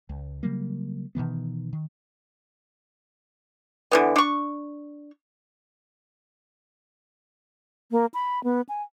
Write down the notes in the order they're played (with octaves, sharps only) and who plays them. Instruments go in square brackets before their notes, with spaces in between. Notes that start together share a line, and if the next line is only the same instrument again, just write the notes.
[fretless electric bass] C#2
C#3 F#3 G3 A#3
B2 D#3 E3 B3
D#3
[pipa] D3 E3 B3
D4 C#6
[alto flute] A#3
B5
B3
G#5